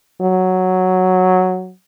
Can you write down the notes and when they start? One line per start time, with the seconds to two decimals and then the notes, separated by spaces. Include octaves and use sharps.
0.22 F#3